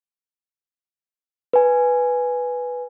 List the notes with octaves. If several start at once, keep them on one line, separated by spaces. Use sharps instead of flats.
B4 G#5